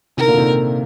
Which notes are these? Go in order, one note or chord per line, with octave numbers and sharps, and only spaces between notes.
C3 D#3 A#4
A#2 D3
C3 D#3